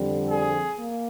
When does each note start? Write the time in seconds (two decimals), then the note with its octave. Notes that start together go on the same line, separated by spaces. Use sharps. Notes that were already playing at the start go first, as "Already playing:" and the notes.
Already playing: F2 D3 G3 C4
0.27 G#4
0.79 A#3